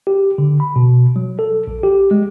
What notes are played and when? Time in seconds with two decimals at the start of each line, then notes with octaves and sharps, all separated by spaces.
0.07 G4
0.38 D3
0.60 B5
0.76 B2
1.16 F#3
1.39 A4
1.67 A#1
1.84 G4
2.11 G#3